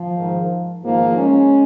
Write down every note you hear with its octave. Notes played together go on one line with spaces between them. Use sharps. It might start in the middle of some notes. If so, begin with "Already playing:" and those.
Already playing: F3
G#2 D#3
G#2 D#3 F3 A#3
G#3 C#4